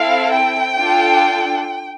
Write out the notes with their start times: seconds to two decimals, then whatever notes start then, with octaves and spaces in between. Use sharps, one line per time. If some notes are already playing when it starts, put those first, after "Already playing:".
Already playing: C4 E4 A4 F5
0.32 G5
0.79 D4 F4 A4